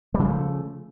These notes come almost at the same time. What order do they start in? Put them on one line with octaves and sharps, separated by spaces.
G3 C#3 F3 A3